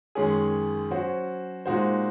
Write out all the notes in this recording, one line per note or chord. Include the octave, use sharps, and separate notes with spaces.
F#2 D#3 G#3 C#4 G#4
F#3 C#4 F#4 C5
A#2 G#3 D#4 F#4 C5